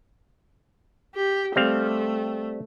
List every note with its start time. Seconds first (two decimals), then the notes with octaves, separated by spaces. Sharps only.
1.15 G4
1.56 G3 A3 C4 F5